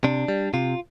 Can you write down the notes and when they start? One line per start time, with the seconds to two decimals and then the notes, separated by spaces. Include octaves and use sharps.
0.04 C3 D4
0.28 G3
0.54 C3 F4